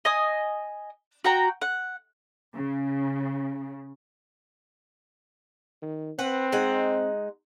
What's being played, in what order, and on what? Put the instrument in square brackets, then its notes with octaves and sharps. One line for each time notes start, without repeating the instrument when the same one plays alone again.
[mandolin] D#5 G#5 D#6
F#4 F#5 G5 A#5
F#5
[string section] C#3
[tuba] D#3
[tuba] C4 [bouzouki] B4 F#5
[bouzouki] G#3 D#4 F#5